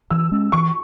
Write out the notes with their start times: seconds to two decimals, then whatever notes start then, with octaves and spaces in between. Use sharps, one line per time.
0.10 E3 E6
0.32 G#3 C#4
0.52 E3 C#6